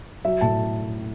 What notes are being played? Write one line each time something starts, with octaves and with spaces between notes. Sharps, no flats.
F#3 E5
A2 A5